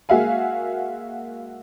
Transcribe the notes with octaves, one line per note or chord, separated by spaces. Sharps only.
G#3 A#3 F#4 E5 F5 G#5